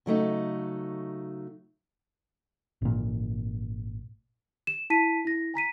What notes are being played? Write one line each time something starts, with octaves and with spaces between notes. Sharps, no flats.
C#3 F#3 A3 D#4
G#1 A#2
E7
E4 A5 B6 D#7
E4 A#6
G#5 A#5 B6 D#7